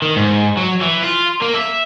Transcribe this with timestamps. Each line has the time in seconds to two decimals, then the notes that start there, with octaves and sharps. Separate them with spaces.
0.02 D#3
0.16 G#2
0.57 F#3
0.82 E3
1.04 F4
1.41 A#3
1.54 E5